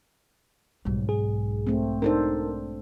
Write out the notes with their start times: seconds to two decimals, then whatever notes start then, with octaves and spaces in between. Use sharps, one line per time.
0.85 B1 G#2 G3
1.09 G#4
1.67 A3 C4
2.02 D4 D#4 A4 A#4 C5